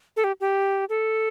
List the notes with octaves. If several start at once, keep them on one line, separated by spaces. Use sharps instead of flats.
A4
G4
G4
A4